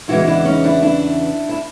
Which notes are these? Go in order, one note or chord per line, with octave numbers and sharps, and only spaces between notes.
E2 C#3 E3 G#3 E4 F#4
D4 E4
C#4 D#4
D4 E4
D4 E4
E4